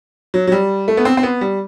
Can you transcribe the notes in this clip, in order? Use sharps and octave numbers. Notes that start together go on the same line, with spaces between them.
F#3
F#3
G3
A3
B3
C4
C4
B3
G3